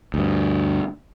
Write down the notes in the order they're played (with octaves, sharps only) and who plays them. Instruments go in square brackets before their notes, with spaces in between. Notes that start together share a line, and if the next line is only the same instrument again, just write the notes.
[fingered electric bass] D2 G2